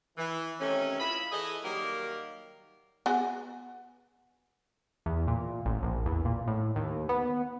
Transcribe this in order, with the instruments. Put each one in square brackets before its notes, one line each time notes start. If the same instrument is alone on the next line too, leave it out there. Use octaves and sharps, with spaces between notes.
[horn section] E3
C3 D#3 A3 C#4
E4 F4 D#5 B5
E3 E4 G#4 A4 D#5
D#3 F#3 G3 A#3 G4 A#4
[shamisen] B3 F#4 G#4
[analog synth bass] E2
A#2
A1
A#1
E2
A#2
A2
D#2
B3